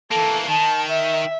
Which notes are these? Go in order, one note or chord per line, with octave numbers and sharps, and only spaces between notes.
E3 A#3 A4
D#3 A5
E5